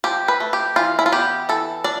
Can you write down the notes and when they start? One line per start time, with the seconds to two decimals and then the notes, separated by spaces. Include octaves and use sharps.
0.04 F3 G4
0.28 B4
0.40 A3
0.53 G4
0.76 E3 F4
0.99 E4
1.06 F4
1.12 B3 G4
1.49 E3 A4
1.84 D4 D5